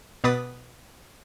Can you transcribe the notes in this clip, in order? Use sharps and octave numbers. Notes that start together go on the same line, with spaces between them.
B2 B3 B4 D6 D#6 A6